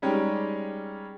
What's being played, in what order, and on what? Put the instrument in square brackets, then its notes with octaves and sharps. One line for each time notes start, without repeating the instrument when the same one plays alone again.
[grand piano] G3 G#3 C#4 D#4 G4